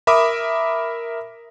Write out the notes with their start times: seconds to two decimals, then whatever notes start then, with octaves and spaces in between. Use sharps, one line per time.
0.07 A#4 E5 B5 D6 D#6